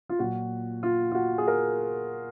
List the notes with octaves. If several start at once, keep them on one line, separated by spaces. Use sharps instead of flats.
F4
A#2 F#3 F#4
F4
F4
F#4
G#4
A#4